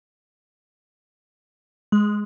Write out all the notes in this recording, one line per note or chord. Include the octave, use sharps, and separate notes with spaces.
G#3